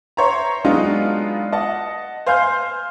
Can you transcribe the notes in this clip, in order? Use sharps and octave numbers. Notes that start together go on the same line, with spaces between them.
C5 C#5 E5 A#5
F#3 G#3 B3 D4 D#4 F4
D#5 F#5 A5
C5 F5 G#5 C6 F6 G6